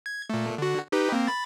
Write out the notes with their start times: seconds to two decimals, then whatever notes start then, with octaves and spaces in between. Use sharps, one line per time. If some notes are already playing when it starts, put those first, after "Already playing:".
0.06 G#6
0.30 A#2 A3
0.58 D3 F#4
0.92 D#4 G4 B4
1.12 A#3 C4
1.27 B5 A6